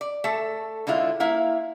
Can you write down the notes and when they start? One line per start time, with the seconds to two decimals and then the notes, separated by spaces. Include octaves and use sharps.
0.01 D5
0.24 A3 A4
0.87 D3 G#3 E4 F4
1.20 A#3 E4 F5